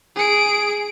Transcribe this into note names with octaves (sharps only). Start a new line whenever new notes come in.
G#4 D7